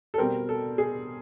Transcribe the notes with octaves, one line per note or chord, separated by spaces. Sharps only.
A4
B2 G3 C4 A#4
A4
G#4